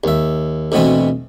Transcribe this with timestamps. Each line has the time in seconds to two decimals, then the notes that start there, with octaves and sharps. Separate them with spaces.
0.04 D#2 E5
0.72 D2 B2 E3 B3 C4